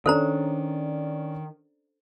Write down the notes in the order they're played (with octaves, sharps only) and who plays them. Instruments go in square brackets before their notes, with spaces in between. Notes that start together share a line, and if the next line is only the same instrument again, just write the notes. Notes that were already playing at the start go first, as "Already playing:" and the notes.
[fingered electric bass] D#3 [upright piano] C#4 D4 D5 [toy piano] A4 C5 A#5